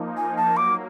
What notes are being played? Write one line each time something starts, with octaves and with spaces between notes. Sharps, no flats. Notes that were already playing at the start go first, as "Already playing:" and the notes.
Already playing: F3 A#3 D#4
G#5
A5
F#3 A#3 D6